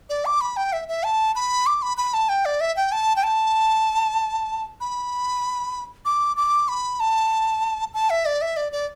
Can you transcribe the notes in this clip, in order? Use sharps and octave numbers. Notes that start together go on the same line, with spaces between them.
D5
D6
B5
G5
E5
E5
A5
B5
D6
B5
B5
A5
G5
D5
E5
G5
A5
G5
A5
B5
D6
D6
B5
A5
A5
E5
D5
E5
D5
D5